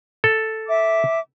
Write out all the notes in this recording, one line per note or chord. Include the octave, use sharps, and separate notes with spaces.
A4
E5 D6